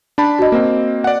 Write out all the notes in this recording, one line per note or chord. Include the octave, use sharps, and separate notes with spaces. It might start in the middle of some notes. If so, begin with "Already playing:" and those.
D4 A5 B5
F#4 D#5
A#3 C4
D5 F#5